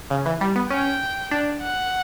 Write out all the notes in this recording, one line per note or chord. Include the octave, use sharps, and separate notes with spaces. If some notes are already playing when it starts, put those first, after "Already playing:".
C#3
E3
G3
B3
C#4 G5
D4
F#5